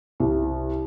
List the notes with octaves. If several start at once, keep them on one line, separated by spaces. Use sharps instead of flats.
C2